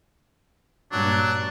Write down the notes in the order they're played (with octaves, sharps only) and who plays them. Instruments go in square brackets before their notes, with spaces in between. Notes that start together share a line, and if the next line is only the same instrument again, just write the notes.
[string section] G2 A#2 [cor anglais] F#3 [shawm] D4